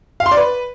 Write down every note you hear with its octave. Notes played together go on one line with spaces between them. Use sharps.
F5
C6
D5
B4